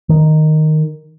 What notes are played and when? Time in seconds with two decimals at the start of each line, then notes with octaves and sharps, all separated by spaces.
0.09 D#3